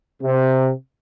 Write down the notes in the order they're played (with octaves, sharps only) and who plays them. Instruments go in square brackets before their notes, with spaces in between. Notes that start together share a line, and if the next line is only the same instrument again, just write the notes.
[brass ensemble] C3